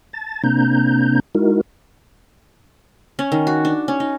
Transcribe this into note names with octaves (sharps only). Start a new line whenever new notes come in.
A5 A6
C3 A#3 C4 D4 A#5 G6
G#3 D#4 E4 F#4 A#4
C#4
D#3
F#4
D4
C#4
D#4